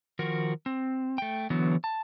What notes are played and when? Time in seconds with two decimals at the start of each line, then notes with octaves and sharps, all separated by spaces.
0.19 D#3 F3 F#4 A#4
0.66 C4
1.18 A3 G5
1.50 D3 E3 F#3 B3
1.84 A5